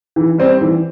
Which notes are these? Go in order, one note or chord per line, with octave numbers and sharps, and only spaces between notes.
E3
G3 C4
E3